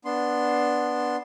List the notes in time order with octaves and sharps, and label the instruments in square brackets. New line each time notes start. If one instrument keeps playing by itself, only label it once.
[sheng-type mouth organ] B3 D4 C6